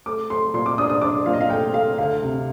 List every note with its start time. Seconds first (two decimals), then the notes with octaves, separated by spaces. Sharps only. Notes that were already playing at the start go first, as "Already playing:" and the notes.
0.06 A3 D6
0.30 A3 C6
0.54 A#2 C6
0.66 D6
0.78 D4 D#6
0.90 D#6
1.02 D4 D6
1.26 A#2 F5
1.33 D#5
1.41 F5
1.50 A3 G5
1.74 A3 F5
1.98 D2 F5
2.23 C3